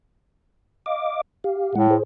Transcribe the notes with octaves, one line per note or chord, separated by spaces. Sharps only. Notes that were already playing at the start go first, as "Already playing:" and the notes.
D#5 F5 D6
G4 F5
A2 G#3 F#5
G#4 C5